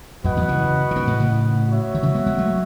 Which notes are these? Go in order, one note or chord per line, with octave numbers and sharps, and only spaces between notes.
F#2 A2 F#4 B4 D#5 F#5
E2 G#2
C#3 E3
E3
B2 D#3
A2 C#3
A2 C#3
F#4 C#5 E5
D#3
C#3 E3
G#3 B3
G#3 B3
F#3 A3